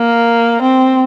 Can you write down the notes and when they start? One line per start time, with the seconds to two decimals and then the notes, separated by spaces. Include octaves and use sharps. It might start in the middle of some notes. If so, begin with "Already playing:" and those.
Already playing: A#3
0.63 C4